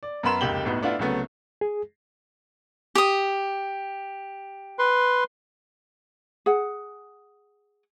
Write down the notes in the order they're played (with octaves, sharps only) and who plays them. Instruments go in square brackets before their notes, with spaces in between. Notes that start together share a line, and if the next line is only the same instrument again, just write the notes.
[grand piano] D5
F#2 B3 A#4 B5 C6 E7
F1 C#2 A#3 G4 F#7 G7
G1 A2 B3 D#4 F#4
A3 B3 D4 E4 F4 F5
C2 C#3 F#3 A3 B3
[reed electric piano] G#4
[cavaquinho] G4 D#6
[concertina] B4 C6
[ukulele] G#4 F#5